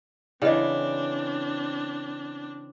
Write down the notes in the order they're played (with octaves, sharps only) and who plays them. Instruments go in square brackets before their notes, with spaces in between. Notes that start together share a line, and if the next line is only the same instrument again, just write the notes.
[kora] C#3 E3 [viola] C4 D4 [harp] E4 D5 [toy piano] D#5 G5